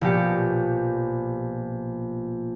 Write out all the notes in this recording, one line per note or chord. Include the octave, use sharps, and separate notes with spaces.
A#1 B2 G4 C#7